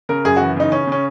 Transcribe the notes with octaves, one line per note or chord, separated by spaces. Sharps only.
C#3 A#4
F#2 G#4
E3 F#4
C#3 D#4
C#3 C#4
C#3 C#4